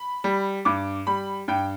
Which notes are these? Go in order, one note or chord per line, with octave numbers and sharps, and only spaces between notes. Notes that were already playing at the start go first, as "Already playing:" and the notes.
Already playing: B5
G3
G2 D6
G3 B5
G2 G5